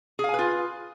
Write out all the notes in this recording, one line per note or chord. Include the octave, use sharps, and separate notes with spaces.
F4 G#4 B4 F5 G#5